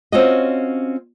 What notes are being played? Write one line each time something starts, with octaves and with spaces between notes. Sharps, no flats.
C4 C#4 F4 F#4 C#5 D#5